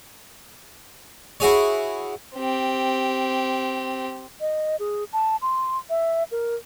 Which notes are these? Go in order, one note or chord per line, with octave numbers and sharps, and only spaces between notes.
E4 F#4 G#4 C#5
C4 G4
D#5
G#4
A5
C6
E5
A#4